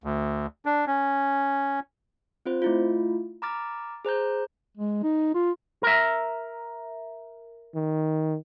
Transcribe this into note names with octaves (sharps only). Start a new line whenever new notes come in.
D2
D4
C#4
C4 F4 C5
A3 E4 F4
A#5 B5 D6 F6 A6
G#4 C5 A#5 G6
G#3
D#4
F4
A#4 E5
D#3